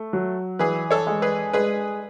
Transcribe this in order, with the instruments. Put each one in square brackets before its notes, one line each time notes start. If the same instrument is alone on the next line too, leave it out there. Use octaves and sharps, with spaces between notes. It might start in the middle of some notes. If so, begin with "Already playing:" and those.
Already playing: [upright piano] A3
F#3
[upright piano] E3 [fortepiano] G#4 B4
[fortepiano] A4 C#5
[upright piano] G#3
[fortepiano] G#4 B4
[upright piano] G#3 [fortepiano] G#4 B4